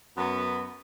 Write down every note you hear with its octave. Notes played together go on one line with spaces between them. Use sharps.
F#2 B3